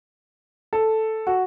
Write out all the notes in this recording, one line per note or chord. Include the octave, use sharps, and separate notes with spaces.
A4
F#4